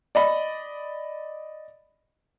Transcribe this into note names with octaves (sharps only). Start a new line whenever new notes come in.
D5 D#5 B5